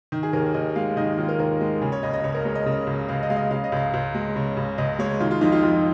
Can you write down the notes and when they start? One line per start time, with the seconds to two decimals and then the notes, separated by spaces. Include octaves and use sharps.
0.12 D#3
0.23 G#4
0.33 D#2 A#4
0.54 D#2 D#5
0.76 G#3 F5
0.97 D#3 D#5
1.18 D#2 F4
1.28 A#4
1.39 D#2 A#4
1.61 G#3
1.81 C#3 G#4
1.92 C#5
2.03 C#2 D#5
2.13 D#5
2.24 C#2 C#5
2.34 A#4
2.45 G#3 C#5
2.55 D#5
2.66 C#3
2.87 C#2
3.09 C#2 F5
3.23 D#5
3.30 G#3 F5
3.37 D#5
3.51 C#3 F5
3.64 D#5
3.72 C#2 F5
3.93 C#2
4.15 G#3
4.36 C#3
4.57 C#2
4.78 C#2 D#5
4.99 G#3 C#5
5.20 D#3 F4
5.31 F4
5.41 F2 D#4
5.52 F4
5.63 F2 F4